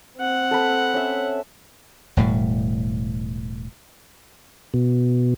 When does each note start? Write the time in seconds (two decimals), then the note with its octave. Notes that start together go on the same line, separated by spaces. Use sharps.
0.18 C4 F#5
0.51 A4 D#5 B5
0.94 C#4 E5
2.17 E1 A2 G3
4.74 B2